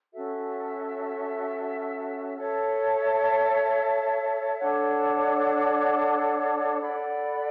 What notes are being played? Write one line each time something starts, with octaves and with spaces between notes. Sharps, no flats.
C#4 F#4 A4 E5
A4 C#5 E5 A5
D4 A4 C#5 F#5
A4 D5 F#5 B5